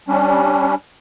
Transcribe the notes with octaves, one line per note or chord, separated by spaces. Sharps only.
G3 C#4 D4